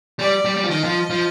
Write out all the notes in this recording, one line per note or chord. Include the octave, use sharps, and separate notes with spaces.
G3 D5
G3
G3
F3
D#3 D#5
F3
F3